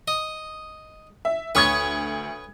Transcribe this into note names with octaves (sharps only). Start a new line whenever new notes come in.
D#5
E5
D2 B4 C#5 C#6 D#6 G#6